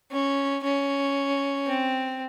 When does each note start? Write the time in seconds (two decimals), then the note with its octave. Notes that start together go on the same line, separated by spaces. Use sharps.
0.12 C#4
0.63 C#4
1.67 C4